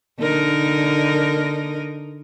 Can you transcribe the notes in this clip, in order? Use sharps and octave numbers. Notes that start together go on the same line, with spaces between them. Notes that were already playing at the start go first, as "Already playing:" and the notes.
D3 D#4 A#4